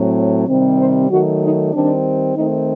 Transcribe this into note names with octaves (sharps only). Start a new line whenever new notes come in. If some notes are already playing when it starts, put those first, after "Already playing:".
Already playing: A2 F#3 C4
C3 D#3 G3 C4
C5
D#3 F#3 A3 F#4
D#4
D#3 G3 C4 D4
D#3 A3 C4 D#4